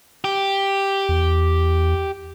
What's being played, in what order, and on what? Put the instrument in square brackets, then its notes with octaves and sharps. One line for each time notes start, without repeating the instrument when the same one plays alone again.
[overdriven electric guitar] G4
[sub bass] E2